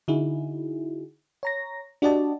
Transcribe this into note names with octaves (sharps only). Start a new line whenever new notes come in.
D3 D#4 E4 F#4 G#4
C#5 A#5 A#6
D4 F#4 G4 D5 D#5 A5